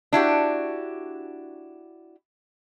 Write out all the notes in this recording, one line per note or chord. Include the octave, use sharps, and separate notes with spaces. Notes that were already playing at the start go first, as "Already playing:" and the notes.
D4 E4 F#4 G4